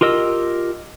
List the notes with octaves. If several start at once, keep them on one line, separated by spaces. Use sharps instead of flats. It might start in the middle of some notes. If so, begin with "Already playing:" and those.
F4 G4 A#4 D#5 E6